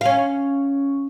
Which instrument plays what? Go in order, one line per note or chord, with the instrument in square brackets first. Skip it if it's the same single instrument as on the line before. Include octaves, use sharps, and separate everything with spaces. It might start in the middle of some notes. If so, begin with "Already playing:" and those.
[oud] C#4 F5